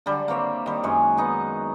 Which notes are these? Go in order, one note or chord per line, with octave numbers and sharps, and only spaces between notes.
D3 F#3 G3
A#3 C4 C#5 E5
D#3 G3
F#2 G#3 C#5
B3 D#4 F#5